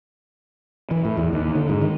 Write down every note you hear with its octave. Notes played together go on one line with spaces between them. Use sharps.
E3
A2
E2
D#2
D3
G#2
D#3